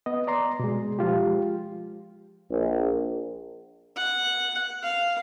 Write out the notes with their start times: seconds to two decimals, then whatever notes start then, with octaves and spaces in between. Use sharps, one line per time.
0.06 B3 D#5
0.27 D5 A#5 C6
0.60 B2 G#3
0.99 F3 G#3 F4 G4
2.51 A#1
3.96 F#5
4.83 F5